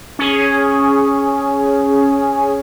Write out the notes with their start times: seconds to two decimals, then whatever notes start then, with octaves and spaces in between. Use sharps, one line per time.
0.19 C#4 G#4